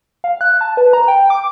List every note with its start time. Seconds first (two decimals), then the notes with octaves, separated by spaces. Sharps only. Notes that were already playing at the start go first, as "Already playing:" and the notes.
0.24 F5
0.41 F#6
0.61 A5
0.77 B4
0.93 A#5
1.08 G5
1.30 D6